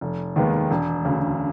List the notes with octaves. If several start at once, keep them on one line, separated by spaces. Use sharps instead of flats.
F1
D#2 D#3 G#3 B3
E1
D2 C#3